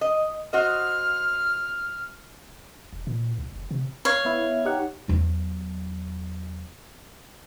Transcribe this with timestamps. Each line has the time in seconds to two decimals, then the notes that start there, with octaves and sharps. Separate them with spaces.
0.01 D#5
0.53 F#4 C5 D#5 F6
2.93 E1
3.07 A#2
3.38 C2
3.52 F#1
3.71 C3
4.05 C#5 F5
4.25 B3 E4
4.65 D#4 G4 F#5
5.08 E2 F#3